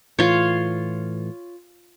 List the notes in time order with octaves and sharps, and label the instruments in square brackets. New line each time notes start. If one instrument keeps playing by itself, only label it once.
[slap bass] A2 E3 [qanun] F4 C#5